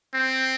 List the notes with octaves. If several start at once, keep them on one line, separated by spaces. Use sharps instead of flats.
C4